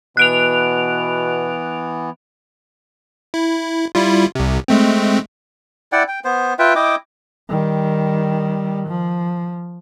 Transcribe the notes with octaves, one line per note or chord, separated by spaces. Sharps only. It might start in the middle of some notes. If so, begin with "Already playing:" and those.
B2 E3 B3 F#6 D7 F7
E4
G3 E4 F4
C2 C3
G#3 A3 C4
E4 D5 F#5 G5
G5
B3 C5
F4 B4 E5 G5
E4 D#5 G5 D6
D#3 G3
F3